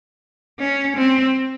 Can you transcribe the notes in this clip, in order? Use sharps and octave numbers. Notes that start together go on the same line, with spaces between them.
C#4
C4